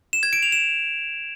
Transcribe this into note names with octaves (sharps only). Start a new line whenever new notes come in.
E7
G#6
D7
F7
E7